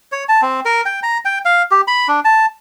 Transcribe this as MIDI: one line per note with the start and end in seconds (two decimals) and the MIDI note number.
0.12 0.24 73
0.29 0.41 81
0.42 0.60 60
0.65 0.81 70
0.86 1.00 79
1.03 1.18 82
1.25 1.39 79
1.45 1.62 77
1.71 1.81 67
1.88 2.08 83
2.08 2.20 62
2.25 2.46 81